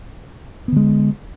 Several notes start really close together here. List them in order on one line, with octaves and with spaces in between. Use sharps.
B3 D3 G#3